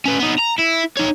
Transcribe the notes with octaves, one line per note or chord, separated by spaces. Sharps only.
C#4 B4
B3 D#4
A#5
E4
D#4 C#5